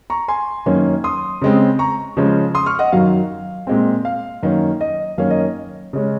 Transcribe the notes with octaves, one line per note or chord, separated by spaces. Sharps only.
A#5 C#6
G#5 C6
F#2 D#3 A#3 C#4
C6 D#6
C#3 G#3 C4
A#5 C#6
C#3 F3 G#3 C#4
C6 D#6
C#6 F6
D#5 F#5
F#2 D#3 F#3 F5
A#2 G#3 C4
F5
F#2 D#3 A#3 C#4
D#5
F#2 D#3 A#3 C#4 F5
D#5
C#3 G#3 C#4